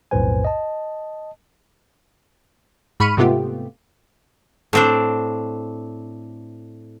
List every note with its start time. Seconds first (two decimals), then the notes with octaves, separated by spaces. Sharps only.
0.11 B1 F2 A2 B4 C5 G#5
0.45 D#5 A5
3.00 G#2 B5 C#6 F6 C#7 D#7
3.17 G#2 C3 A3 B3 F4 G4
4.73 A2 C4 D4